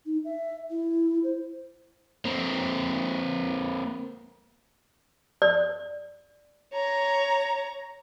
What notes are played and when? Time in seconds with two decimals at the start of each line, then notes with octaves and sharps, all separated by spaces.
0.06 D#4
0.25 E5
0.71 E4
1.24 C5
2.25 A#3 C4
5.42 D5
6.73 C#5 A#5